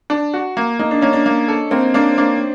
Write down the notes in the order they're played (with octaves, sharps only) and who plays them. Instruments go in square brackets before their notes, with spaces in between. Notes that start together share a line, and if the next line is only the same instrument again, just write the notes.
[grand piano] D4
F#4
A#3
[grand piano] A#3 [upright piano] D#4
[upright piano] D4
[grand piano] A#3 [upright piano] C#4
[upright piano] D4
[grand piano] A#3
A4
[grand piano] A#3 [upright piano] C4
[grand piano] A#3 [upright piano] D4
[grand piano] A#3 [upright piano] D4